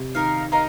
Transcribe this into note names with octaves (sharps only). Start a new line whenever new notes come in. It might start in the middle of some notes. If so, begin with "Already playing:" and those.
Already playing: C3
D#3 D#4 A#4 F5
D#4 A#4 F5